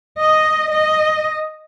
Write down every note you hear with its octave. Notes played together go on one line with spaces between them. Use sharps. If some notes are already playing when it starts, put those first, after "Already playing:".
D#5
D#5